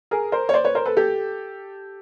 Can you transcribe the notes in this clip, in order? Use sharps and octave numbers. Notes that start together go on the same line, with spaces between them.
G#4 A#4
A#4 C5
C#5
C5 D5
B4 C#5
A#4 C5
A4 B4
G4 A4